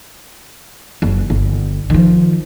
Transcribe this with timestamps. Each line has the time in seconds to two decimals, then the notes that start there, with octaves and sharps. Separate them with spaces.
1.02 F#1
1.30 G1
1.90 D#3 F3